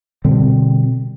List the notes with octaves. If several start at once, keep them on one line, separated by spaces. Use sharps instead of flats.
B2 D3 G3 C4